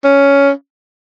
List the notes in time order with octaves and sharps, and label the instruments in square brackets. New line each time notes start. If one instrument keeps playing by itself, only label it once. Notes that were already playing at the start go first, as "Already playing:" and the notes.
[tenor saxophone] C#4